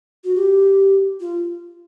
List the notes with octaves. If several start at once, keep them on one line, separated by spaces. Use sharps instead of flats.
F#4
G4
F4